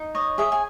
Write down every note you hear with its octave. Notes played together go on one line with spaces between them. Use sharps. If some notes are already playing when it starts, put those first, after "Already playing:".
Already playing: D#4
C#5 D#5
G#4 E5
G#5